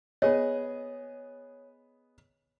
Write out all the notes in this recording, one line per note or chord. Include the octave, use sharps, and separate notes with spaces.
B3 G#4 C#5 D#5